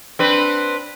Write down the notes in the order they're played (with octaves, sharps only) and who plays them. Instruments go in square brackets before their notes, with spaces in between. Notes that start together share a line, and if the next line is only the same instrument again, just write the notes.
[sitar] C4 D4 B4